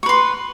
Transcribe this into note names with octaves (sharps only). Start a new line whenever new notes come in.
B4 C6 C#6